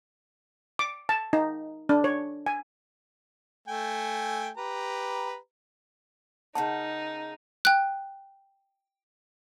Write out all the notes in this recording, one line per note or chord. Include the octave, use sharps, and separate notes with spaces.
D6
A5
D#4
D4
C#5
G#5
A3 G5 G#5
G4 B4 A#5
C#3 A#3 D#4 F#5 A5
G5 F#6